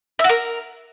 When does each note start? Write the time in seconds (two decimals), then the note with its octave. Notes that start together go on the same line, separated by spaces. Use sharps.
0.19 E5
0.24 F#4
0.29 A#4